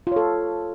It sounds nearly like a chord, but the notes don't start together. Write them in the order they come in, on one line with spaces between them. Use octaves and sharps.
F4 C#5 A4